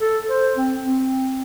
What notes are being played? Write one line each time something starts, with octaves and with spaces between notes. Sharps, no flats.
A4
C5
C4
C4